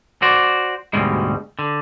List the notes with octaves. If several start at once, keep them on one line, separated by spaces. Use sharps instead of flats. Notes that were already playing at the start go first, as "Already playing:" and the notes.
F#4 C5 D5
D2 G#2 B2 G3 G#3
D3